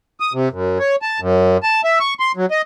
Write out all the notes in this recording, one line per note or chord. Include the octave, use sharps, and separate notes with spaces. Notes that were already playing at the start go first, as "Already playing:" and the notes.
D#6
C3
F#2
C#5
A5
F#2
A5
E5
C#6
C6
F#3
D#5